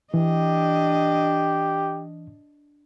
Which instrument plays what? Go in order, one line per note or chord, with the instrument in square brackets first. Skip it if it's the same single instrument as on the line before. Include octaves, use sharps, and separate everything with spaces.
[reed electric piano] E3 [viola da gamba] D4 D#5 [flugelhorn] G4